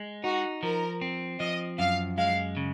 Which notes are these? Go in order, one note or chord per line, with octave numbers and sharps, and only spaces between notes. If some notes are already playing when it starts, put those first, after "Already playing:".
Already playing: G#3
D#4 F#4
F3 A#4
C4
F3 D#5
F#2 F5
G#3 F5
C#3